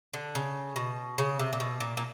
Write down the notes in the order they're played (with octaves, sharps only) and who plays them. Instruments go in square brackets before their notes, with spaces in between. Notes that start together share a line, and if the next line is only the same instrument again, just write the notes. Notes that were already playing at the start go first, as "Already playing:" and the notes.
[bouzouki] D3
C#3
B2
C#3
C3
A#2
B2
A#2
A#2